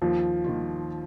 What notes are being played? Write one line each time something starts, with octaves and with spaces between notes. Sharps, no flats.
D#2 F3
D#3 A#3 F4